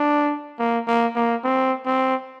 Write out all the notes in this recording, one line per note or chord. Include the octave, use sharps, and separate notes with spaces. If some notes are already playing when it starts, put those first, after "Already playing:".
Already playing: D4
A#3
A#3
A#3
C4
C4